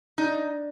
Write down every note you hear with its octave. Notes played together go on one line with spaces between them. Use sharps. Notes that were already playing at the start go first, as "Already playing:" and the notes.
D4 D#4